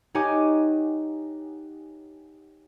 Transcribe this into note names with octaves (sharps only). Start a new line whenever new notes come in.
D#4 G4 C#5 F#5 G#5 D6